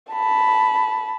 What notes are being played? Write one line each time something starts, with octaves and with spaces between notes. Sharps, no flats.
A5 B5